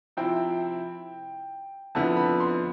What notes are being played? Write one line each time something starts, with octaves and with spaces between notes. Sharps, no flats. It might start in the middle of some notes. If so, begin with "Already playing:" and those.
C3 F3 C4 E4 G5
F2 D3 F3 B3 E4 A5
B5
C6